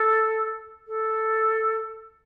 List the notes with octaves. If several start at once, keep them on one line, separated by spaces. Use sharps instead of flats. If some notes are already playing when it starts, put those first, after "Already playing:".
Already playing: A4
A4